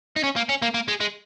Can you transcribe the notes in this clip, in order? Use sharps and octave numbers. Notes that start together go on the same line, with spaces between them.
D#4
C#4
A#3
C#4
A#3
A#3
G#3
G#3